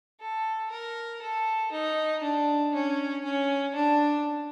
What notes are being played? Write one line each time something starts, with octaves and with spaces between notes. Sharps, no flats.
A4
A#4
A4
D#4
D4
C#4
C#4
D4